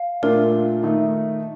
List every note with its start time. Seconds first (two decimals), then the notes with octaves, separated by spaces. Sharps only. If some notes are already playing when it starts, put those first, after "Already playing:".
Already playing: F5
0.23 A#2 A3 D4 F4 A#4
0.83 D#3 A3 D#4